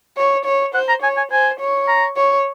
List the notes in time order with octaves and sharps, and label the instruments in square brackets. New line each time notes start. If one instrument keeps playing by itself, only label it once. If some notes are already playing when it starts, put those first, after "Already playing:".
[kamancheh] C#5
C#5
[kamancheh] C5 [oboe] F#5
[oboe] A#5
[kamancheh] C#5 [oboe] G#5
[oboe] G#5
[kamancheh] C5 [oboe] G#5
[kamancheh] C#5
[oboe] A#5
[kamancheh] C#5